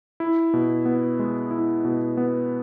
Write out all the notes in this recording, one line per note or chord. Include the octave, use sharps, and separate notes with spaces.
E4
B2
B3
G#3
E4
B2
B3